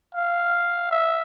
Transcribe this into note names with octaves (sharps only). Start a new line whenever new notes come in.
F5
E5